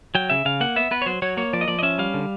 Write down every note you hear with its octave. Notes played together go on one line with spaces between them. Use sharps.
F#3 G5
C#3 E5
C#3 F5
A#3 F#5
B3 E5
B3 B4
C#5
F#3 C5
F#3 C#5
A#3 C#5
F3 D5
D#5
F3 D5
D#5
C#4 E5
G3 F5
D3